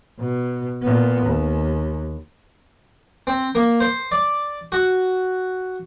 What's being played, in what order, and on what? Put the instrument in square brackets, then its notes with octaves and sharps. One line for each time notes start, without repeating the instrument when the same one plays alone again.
[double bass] B2
A#2 B3
D#2
[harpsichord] C4
A#3
C5
D5
F#4